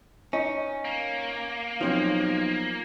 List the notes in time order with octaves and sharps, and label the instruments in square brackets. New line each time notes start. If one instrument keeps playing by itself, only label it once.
[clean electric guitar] C#4 [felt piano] D#4
[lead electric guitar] A#3
[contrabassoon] B1 [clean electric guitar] F3 [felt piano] C4 C#4